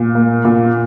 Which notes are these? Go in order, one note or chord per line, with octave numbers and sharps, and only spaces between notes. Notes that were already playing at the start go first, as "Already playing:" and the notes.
Already playing: A#2
A#3
A#2